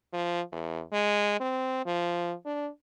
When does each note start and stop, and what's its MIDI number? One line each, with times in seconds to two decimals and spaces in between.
0.13 0.41 53
0.52 0.82 40
0.92 1.38 56
1.40 1.83 60
1.86 2.34 53
2.45 2.69 62